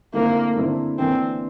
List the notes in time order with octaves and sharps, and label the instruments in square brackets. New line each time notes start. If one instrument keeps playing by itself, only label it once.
[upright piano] D3 A3 C4 E4 [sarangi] A#3
[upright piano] D3 A3 C4 E4
[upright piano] E3 A#3 D4 [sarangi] C4